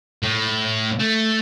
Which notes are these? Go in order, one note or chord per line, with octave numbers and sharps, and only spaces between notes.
A2
A3